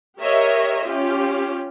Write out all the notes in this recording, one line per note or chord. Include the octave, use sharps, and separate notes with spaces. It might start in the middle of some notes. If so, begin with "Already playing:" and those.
G4 A#4 C#5 D#5 E5
C#4 F4 G4